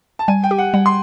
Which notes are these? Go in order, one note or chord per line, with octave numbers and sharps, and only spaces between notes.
A5
G3 G#5
G5
G4
F#5
G3 F#5
C6